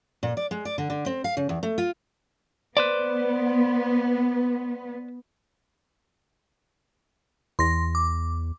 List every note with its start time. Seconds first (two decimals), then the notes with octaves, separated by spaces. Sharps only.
0.23 A#2
0.37 D5
0.51 G#3
0.65 D5
0.78 D3
0.90 D3
1.06 C4
1.24 F5
1.37 C#3
1.49 E2
1.63 A3
1.78 F4
2.77 B3 B4 C5 D5
7.59 E2 C6 A#6
7.95 D6